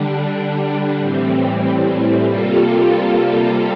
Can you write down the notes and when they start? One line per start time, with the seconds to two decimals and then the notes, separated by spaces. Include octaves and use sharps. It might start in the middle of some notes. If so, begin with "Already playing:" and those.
Already playing: D3 G3 D4
0.98 A2 E3 G3 C4
2.26 C3 G3 A#3 F4 A4